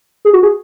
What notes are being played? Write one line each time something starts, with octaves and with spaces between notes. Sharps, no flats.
G#4
F#4
G#4